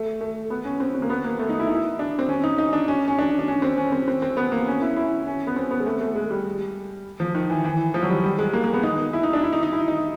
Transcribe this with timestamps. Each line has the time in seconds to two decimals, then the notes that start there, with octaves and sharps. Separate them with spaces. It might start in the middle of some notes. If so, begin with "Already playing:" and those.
Already playing: A3
0.21 A3
0.50 B3
0.65 C#4
0.80 C4
0.95 C4
1.02 A#3
1.10 B3
1.24 A#3
1.39 A3
1.49 D#4
1.60 E4
1.67 D#4
1.75 E4
1.99 D4
2.19 C4
2.29 C#4
2.44 D#4
2.58 D#4
2.73 D4
2.88 C#4
3.08 C#4
3.19 D4
3.39 D4
3.48 C#4
3.62 C4
3.77 C#4
3.92 C4
4.08 C4
4.22 C4
4.37 B3
4.52 A#3
4.67 C#4
4.82 E4
4.96 E4
5.27 C#4
5.47 B3
5.56 C4
5.71 B3
5.80 G#3
5.86 A3
6.01 A3
6.15 G#3
6.31 G3
7.20 F3
7.35 D#3
7.50 E3
7.65 E3
7.94 F3
8.03 F#3
8.09 G3
8.24 G3
8.39 G#3
8.53 A#3
8.64 A#3
8.73 B3
8.83 D#4
9.13 E4
9.23 D#4
9.33 D4
9.43 E4
9.53 D#4
9.63 D#4
9.72 E4
9.88 D#4